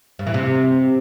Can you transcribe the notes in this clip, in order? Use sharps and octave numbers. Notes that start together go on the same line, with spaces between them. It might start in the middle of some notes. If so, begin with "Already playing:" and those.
G2
E3
C3